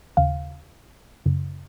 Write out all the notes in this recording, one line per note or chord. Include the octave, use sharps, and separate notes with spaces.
D#2 C#3 F5
F#2 C#3